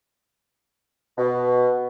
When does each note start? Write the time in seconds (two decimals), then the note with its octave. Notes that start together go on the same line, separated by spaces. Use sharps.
1.18 B2